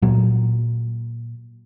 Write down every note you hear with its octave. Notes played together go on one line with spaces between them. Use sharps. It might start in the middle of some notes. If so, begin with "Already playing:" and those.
A#2 F#3 A#3